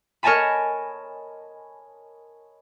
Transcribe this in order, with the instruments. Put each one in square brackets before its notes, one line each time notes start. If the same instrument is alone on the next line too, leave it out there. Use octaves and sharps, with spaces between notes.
[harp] A#4 C#5 D#5 G#5 A5 B5